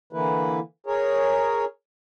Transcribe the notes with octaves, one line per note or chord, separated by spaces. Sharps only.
D3 E3 A#3 E4 B4
G#4 A#4 C#5